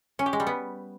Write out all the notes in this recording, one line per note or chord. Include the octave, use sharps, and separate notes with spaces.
C#4
G4
G#3
G3
B3